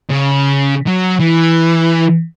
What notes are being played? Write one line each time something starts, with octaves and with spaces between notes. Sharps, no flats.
C#3
F#3
E3